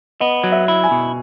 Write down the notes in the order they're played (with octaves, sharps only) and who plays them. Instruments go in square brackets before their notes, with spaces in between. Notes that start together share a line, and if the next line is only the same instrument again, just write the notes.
[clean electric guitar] B3 [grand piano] D#5
[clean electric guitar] F#3
[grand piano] E5
[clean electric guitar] E4
[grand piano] G#5
[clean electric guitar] B2